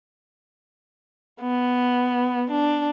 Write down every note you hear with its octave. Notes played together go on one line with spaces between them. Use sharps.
B3
D4